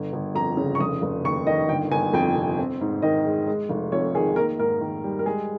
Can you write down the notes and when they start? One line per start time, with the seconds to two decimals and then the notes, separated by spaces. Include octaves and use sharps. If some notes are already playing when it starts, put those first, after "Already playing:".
Already playing: G1
0.13 G1
0.35 F2 A#5
0.57 C#3
0.75 C#6
0.80 F1 D#6
1.02 F1
1.24 D#2 C#6
1.47 D#3 D#5
1.69 G1 G5
1.91 G1 G#5
2.13 F2 G5
2.36 C3
2.59 C4
2.81 G#2
3.02 D#3 D#5
3.25 G#3
3.47 G#3
3.69 F1
3.92 F2 C#5
4.15 D#3 G#4
4.36 A#3 A#4
4.59 G#2 A#4
4.81 D#3
5.04 G3
5.19 A#4
5.26 G#3 G#4